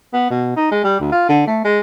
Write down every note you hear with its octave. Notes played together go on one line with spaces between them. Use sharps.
B3
B2
D#4
G#3
G3
D2
F4
D3
A3
G#3